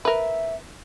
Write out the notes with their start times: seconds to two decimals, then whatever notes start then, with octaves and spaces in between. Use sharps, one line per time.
0.05 A#4 B4 E5